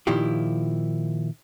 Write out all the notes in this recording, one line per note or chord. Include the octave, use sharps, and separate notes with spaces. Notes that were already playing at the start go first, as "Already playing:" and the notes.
A#2 D#3 F3 E4 G4